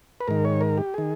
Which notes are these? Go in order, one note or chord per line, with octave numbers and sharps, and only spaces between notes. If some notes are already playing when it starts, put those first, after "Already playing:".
B4
G#2 D#3 A#4
C#5
A#4
G4
D#3 G#4